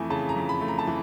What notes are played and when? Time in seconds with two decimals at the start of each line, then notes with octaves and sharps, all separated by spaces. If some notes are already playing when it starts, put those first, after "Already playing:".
Already playing: F2 E3 A3 G#5
0.10 C#3 A5
0.29 A#5
0.36 F2
0.49 B5
0.61 A3
0.68 A#5
0.79 A5
0.87 E3